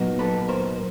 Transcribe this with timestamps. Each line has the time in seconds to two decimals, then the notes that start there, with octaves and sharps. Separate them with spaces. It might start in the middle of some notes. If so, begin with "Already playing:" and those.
Already playing: A#2 F#3 B3 D#4
0.19 A4 B4
0.48 A#4 C5